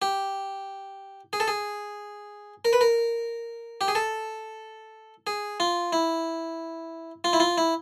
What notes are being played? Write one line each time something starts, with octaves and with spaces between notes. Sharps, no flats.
G4
G#4
A4
G#4
A#4
B4
A#4
G4
G#4
A4
G#4
F4
E4
F4
E4
F4
E4